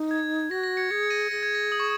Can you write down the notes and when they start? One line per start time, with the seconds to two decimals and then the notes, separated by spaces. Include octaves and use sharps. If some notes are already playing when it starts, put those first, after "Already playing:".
Already playing: D#4
0.11 G#6
0.50 F#4 A#6
0.63 A#6
0.77 G#6 C#7
0.91 G#4 G#6 C#7
1.03 C#7
1.10 A#6 D#7
1.31 G#4 A#6
1.43 G#6
1.55 A#6
1.72 D#6
1.80 C#6